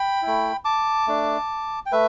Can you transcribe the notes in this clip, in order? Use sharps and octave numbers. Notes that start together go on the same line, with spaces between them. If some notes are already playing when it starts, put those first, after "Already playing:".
Already playing: G5 B5
A3 E4
A5 D6
A3 D4
G5
A3 B4 E5